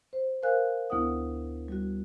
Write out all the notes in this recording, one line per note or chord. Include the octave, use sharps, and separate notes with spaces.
C5
A#4 C5 F5 G#5 F#6
D2 B3 E4 A#4 F#5 D#6
G3 F#4